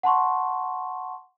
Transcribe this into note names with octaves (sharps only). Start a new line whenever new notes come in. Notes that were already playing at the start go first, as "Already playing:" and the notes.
F#5 A5 C6 C#6